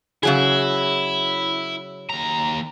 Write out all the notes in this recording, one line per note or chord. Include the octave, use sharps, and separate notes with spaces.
C#3 F#3 E4 G#4
D#2 A#5